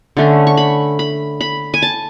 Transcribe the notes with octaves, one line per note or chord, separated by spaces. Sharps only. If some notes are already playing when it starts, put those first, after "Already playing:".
D3 A3 C#4
C#6
B5
B5
B5
G#5
A5